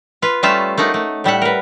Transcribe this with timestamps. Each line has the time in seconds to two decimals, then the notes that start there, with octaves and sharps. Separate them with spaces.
0.22 F4 B4
0.43 G3 A3 C#4 F4 E5 A5
0.78 A3 A#3 D#4 F#5
0.94 A3
1.24 A2 G3 E5 F#5
1.42 A#4 B4